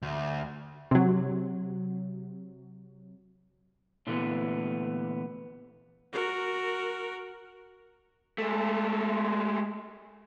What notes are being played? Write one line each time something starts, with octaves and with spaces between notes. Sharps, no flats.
D2
C3 F#3
A#2 D3 E3 A3 B3
F#4 A#4
G#3 A3